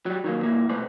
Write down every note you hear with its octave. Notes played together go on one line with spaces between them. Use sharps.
F#3 G3
D#3 F#3 A#3
G2 B2 A#3 E4
C2 B2 A3 B3 C5 D5